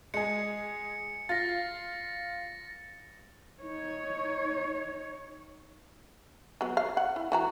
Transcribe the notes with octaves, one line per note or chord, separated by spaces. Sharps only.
G#3 G#4 C#7
F4 A6 A#6
D#4 C#5
F#3 B3
F5
F#5
E4
E3 F#4 A#5